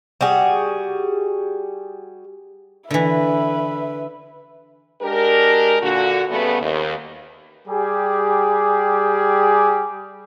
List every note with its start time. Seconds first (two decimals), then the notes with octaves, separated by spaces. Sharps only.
0.21 G3 F#4 G#4
2.91 D3 E3 B4 E5
5.02 G#3 D4 G4 A#4
5.82 A#2 D3 F#4
6.29 C#3 G3 A3 B3
6.62 D#2
7.68 G3 G4 G#4